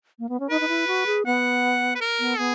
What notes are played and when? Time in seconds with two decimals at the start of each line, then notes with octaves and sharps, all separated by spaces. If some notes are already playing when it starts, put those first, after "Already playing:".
0.19 A#3
0.29 B3
0.40 C#4
0.50 D#4 B4
0.61 D#4
0.68 E4
0.87 F#4
1.06 G#4
1.26 B3 F#5
1.95 B4
2.01 A#4
2.19 B3
2.38 B3 G#4